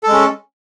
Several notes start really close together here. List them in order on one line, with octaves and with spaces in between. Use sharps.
A4 G#3 C#4